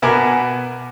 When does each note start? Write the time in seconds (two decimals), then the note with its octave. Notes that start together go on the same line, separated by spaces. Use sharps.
0.02 B2 B3 A#4 G#5 B5 D6